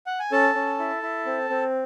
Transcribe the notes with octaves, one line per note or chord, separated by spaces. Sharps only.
F#5
G#5
C#4 A4 A5
C#4
E4
E4
C4
C4